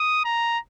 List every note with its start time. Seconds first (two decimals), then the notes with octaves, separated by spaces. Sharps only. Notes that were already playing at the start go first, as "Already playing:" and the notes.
Already playing: D#6
0.25 A#5